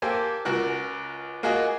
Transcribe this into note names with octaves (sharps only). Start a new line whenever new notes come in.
A#3 G4 A4 C5 G#5
C#2 F#4 A#4 F#6
A#3 F4 F#4 G#4 D#5